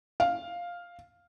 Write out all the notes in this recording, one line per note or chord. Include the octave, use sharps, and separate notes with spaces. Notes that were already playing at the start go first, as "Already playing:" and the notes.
F5